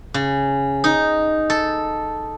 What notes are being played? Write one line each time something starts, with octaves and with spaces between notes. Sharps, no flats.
C#3
D#4
A4